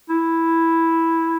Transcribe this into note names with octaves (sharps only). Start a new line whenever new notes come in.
E4